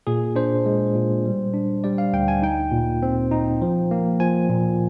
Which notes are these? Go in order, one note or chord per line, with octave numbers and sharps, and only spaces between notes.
A#2 G#4
D4 C5
G#3
A#2
G3
D4
G3 D5
F5
D2 G5
G#5
D#4 G5
A#2
C4
D#4
F3
A#3
F3 G#5
A#2